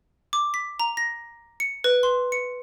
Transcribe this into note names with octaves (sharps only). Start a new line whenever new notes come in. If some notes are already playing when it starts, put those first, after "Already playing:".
D6
B6
A#5
A#6
C#7
B4
C6
C#7